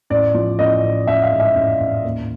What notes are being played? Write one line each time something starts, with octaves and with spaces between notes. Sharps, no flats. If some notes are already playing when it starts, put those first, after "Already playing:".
A1 D5
F3
A1 D#5
A1
A1 E5
F5
G#2
E5
A1
A1
D#2